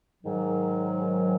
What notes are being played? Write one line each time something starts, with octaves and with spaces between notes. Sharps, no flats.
G#2 D#3 F#3